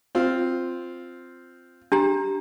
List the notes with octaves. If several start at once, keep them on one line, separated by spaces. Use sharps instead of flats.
C4 F4
D4 G4 A#5